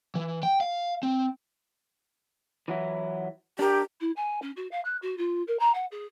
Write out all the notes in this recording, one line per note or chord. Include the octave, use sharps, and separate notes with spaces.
E3
G5
F5
C4
E3 F#3 E4
D4 G4 A#4
E4
G#5
C#4
F#4
F5
F#6
F#4
F4
A#4
A#5
F#5
G#4